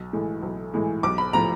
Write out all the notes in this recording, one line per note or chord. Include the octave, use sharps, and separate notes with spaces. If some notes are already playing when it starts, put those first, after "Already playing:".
Already playing: B1
A2 E3 G#3
B1
A2 E3 G#3
B1 D6
B5
A2 F3 A#5